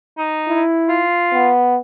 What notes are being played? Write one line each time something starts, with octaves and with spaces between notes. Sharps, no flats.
D#4
E4
F4
B3